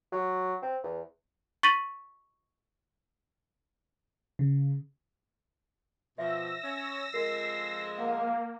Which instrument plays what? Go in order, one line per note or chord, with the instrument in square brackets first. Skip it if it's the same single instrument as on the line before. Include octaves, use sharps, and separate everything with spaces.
[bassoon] F#3
C4
E2
[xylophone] C#6 A6 B6 D#7 F#7
[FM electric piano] C#3
[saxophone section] B2 F3 [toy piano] E5 [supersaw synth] E6 A#6
[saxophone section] C#4
[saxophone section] F2 F3 G#3 [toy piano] A#4 [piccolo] C7
[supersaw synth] A#3 [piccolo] F5 [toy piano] F#5